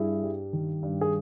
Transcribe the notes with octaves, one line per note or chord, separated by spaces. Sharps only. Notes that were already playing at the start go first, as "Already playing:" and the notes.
Already playing: G2 E4 G#4
G3
D#3
G2
G#4